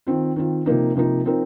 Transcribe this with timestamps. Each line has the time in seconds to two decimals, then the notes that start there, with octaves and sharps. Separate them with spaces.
0.07 D#3 C4 F4
0.36 D#3 C4 F4
0.66 C3 F3 A#3 D#4
0.95 C3 F3 A#3 D#4
1.25 F3 C4 D#4 A#4